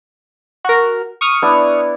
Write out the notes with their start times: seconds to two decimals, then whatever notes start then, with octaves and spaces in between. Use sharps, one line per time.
0.65 F#4 A#4
1.21 C#6 D#6 F6
1.42 B3 D4 E4